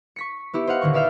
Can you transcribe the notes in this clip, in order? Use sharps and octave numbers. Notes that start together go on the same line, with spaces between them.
C#6 B6 C#7
B3 E4 G4
C5 D#5 F5 F#5
D#1 D3 D#3 C#6
B4 D5 E5 F5 F6 G6